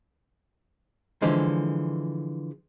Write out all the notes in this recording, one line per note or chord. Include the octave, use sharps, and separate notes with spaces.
D3 E3 F3 G#3